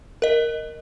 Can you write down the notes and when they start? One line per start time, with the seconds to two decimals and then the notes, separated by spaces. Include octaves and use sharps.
0.22 A#4 D#5